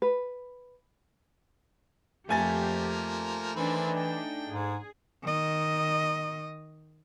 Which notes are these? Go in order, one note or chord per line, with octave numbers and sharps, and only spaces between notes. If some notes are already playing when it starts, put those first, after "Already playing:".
B4
F2 F3 A3 A#3 G4 G#5 A6
D#3 E3 C4 D4 D#4 B5
G5
G#2 G#4
D#3 D#5